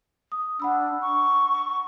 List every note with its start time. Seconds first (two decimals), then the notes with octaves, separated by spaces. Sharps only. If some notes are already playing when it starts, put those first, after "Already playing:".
0.32 D#6
0.60 D4 F#5 B5 E6
1.01 C#6